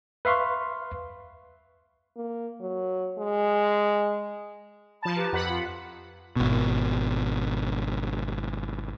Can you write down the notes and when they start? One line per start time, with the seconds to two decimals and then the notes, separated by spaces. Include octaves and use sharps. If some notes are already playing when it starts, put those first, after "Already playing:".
0.25 B4 E5 F5 C6 C#6
2.16 A#3
2.60 F#3
3.18 G#3
5.03 F3 A5 B5
5.16 G4 B4 A#5
5.33 F2 F#5 B5
5.47 F4
6.36 G#1 B2